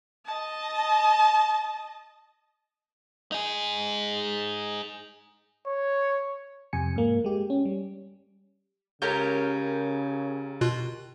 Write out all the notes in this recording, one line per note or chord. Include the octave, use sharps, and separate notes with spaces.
D#5 A5
D#4 G#4
C#5
F2 C3 G#5 C#7
G#2 A#3
G#3 G4
C#4
G3
C#2 C#3 G4 A#4 C#5 G6
B2 F4 F#6